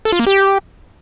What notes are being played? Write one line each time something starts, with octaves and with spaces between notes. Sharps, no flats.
A4
F4
A#3
G4